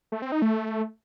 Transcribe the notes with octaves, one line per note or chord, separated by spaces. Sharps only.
A3
C4
D#4
A3